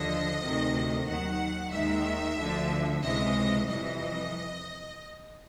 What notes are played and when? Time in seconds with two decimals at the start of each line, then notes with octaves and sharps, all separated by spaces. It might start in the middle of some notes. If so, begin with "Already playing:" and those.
Already playing: D#2 D3 F3 D#5
0.42 D2 C3 D#3
1.07 D#2 D#3 F#3 F#5
1.72 D#2 D#3 G#3 E5
2.38 D2 D3 F3
3.03 C#2 C3 E3 G#3 D#5
3.68 F2 C3 E3 G3 D#5